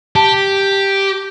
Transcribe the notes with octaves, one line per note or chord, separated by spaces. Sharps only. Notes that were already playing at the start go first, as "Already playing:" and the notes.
G4 A5